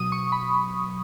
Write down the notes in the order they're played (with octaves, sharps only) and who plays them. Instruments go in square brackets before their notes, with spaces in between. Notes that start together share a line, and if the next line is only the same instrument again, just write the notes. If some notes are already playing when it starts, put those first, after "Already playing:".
Already playing: [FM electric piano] B2 F#3 D#6
C#6
B5